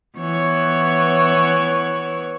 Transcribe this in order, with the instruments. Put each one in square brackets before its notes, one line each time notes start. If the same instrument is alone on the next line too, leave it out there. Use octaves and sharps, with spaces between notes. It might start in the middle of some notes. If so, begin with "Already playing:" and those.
[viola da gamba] E3 B3 C#5